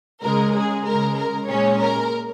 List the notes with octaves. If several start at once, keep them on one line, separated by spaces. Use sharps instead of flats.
C#3 G#3 A#4
G#4
C#3 G#3 A#4
A#4
A#2 G#3 C#4 C#5
A#4